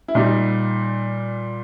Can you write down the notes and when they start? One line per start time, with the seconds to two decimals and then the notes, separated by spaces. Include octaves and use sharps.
0.08 E4
0.15 A#2 G3 D#4